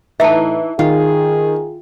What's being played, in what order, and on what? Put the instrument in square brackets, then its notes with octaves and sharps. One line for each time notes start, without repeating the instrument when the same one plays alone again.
[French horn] A2 [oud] E3 D#4 [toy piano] E5 A5
[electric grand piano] D#3 [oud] F4 [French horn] G#4